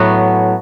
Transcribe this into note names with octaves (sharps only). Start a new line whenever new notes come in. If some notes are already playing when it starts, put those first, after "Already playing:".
Already playing: A2 F#3 B3